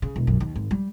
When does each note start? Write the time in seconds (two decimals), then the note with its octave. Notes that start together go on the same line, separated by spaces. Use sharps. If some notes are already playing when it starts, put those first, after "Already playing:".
0.02 C#3
0.16 E1
0.27 B1 F#2
0.40 D#2
0.56 G#1
0.71 G3